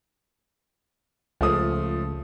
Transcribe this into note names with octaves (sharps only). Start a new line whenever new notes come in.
C#2 F3 A3 D#6